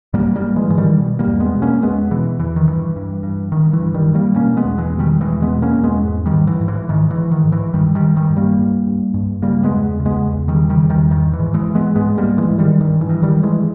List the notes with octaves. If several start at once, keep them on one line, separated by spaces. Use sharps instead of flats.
G#2 G3 A#3
G3 A#3
G#2
E3 G#3
G#2 E3
D#3 G3
B2
G3 A#3
E2
G#3 B3
B2
A#3 C#4
E2 G#3 B3
B2 E3
E2 E3
D#3
G2 E3
G2
G2
G2 D#3
E3
G2
D#3 G3
G2
G3 A#3
B2 A#3 C#4
G#3 B3
E2
E3 G#3
B2
D#3 G3
E2 E3 G#3
G#3 B3
B2
A#3 C#4
E2
G#3 B3
G#2
D#3 G3
G#2
E3
G#2
E3
G#2 D#3
E3
G#2
D#3
G#2
E3
G2 D#3 G3
D#3 G3
G2
D#3 G3
G2
G3 A#3
G2
G2
G2
C#3 G3 A#3
G#3 B3
E2
C#3
G#3 B3
E2
D#3 G3
C#3
D#3 G3
E2
D#3 G3
G#2 D#3
E3
G#2
E3 G#3
G#2
G#3 B3
G#2 G#3 B3
G3 A#3
G#2
E3 G#3
G#2
D#3 G3
G2 D#3
E3
G2
D#3 G3
G2
E3 G#3